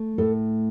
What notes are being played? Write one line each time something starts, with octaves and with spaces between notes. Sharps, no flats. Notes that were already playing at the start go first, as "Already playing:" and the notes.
Already playing: A3
A2 A4